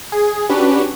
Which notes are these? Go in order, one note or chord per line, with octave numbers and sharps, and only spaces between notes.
G#4
C#4 D4 F#4 G4 B4